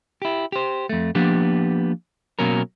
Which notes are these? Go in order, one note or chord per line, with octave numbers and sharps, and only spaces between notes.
E4 G4
G4 C5
F2 A3
F3 A#3 B3 D4 G4
B2 F#3 A#3 C#4 A#4